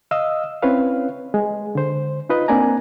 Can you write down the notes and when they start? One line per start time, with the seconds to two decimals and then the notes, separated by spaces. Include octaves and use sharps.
0.11 D#5 F5 D#6 E6
0.63 C4 C#4 E4 B4 C#5 F5
1.34 G#3
1.75 D3 C5
2.29 D#4 F4 B4 D#5
2.48 A#3 C4 D4 D5 G#5 A#5